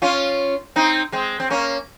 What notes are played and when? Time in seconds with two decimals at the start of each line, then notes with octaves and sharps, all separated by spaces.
0.02 C#4 F4
0.76 C4 D#4
1.12 G#3 C4
1.40 C4
1.50 A#3 C#4